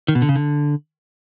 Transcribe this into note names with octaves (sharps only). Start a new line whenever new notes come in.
D#3
B2
D3
C#3
D3